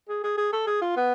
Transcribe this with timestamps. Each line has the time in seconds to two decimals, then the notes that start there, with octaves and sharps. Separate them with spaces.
0.09 G#4
0.24 G#4
0.38 G#4
0.52 A4
0.67 G#4
0.82 F4
0.97 B3